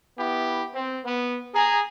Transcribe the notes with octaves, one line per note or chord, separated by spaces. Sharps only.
B3 E4 G4
C4
B3
G#4 A#5